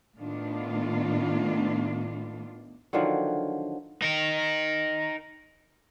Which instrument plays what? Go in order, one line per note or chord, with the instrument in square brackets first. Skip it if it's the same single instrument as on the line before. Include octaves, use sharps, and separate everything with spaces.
[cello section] A2 D#3 A3 B3 D4 F4
[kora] D3 D#3 F3 F#3
[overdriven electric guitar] D#4 A#4